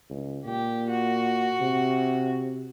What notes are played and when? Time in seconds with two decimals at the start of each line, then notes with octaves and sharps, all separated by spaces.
0.10 C#2
0.46 A#2 G4
0.90 F#4
1.61 C3